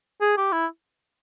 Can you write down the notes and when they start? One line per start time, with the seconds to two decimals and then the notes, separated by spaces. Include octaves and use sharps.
0.21 G#4
0.37 G4
0.52 E4